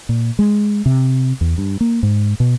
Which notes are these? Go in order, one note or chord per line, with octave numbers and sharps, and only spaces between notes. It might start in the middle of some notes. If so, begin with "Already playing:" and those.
A#2
G#3
C3
E2
G2
A#3
G#2
B2